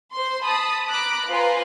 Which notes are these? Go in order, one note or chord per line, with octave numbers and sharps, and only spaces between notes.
C5 C6
A5 B5 D#6
A#5 B5 D6 F#6 D7
F4 B4 C5 G#5 A#5 C6